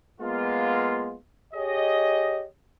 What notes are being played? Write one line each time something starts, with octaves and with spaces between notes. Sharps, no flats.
G#3 A#3 B3 F4
G4 G#4 C#5 D#5